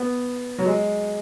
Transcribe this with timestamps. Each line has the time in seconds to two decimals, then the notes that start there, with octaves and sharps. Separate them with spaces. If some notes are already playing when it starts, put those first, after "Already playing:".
Already playing: B3
0.58 F#3
0.66 G#3